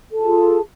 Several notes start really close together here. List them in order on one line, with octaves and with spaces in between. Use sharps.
A4 A5 F4 G#4